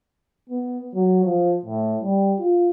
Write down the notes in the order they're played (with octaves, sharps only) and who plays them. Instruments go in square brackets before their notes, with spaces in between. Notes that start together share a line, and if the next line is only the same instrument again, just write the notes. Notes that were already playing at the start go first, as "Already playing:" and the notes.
[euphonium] B3
F#3
F3
A2
G3
F4